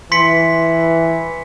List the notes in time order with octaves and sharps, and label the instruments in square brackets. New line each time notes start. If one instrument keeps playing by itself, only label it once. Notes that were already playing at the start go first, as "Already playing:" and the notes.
[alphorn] E3 [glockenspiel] C6 B6 C#7